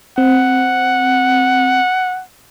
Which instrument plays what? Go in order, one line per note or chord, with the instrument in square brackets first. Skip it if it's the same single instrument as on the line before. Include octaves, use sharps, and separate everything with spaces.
[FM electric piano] C4 [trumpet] F#5